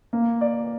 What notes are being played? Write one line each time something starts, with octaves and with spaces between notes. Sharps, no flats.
A#3
D5